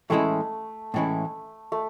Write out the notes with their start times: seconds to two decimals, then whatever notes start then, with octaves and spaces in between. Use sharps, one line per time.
0.10 A2 E3 G#3 A3 C#4 E4
0.94 A2 E3 G#3 C#4 E4
1.72 A3